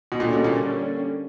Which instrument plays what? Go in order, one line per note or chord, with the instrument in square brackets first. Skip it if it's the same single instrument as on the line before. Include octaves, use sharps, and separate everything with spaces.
[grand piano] B2
[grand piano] A#2 [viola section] D3 G3 A#3 C#4
[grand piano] B2
A#2